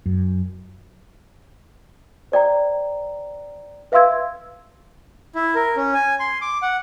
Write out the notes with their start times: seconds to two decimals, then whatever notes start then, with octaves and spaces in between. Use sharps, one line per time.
0.06 F#2
2.32 C5 D5 G5 A#5
3.92 B4 E5 F5 C6 E6 G#6
5.35 E4
5.55 A#4
5.76 C#4
5.94 G#5
6.20 C6
6.41 D6
6.62 F#5